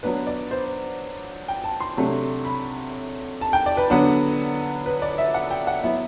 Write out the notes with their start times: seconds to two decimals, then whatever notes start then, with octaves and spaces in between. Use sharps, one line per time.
0.03 F#3 B3 D4 B4
0.27 D5
0.51 C5
1.48 G5
1.64 A5
1.80 C6
1.97 C3 F#3 A3 D4
2.45 B5
3.41 A5
3.53 G5
3.66 D5
3.77 B4
3.90 D3 F#3 B3 D4
4.86 B4
5.02 D5
5.18 E5
5.34 F#5
5.51 G5
5.67 F#5
5.83 F#3 B3 E4 E5